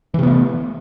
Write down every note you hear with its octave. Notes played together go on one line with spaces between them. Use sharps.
C3 E3 A3 B3